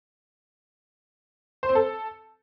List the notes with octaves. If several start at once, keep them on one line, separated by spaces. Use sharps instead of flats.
C5
C4
A4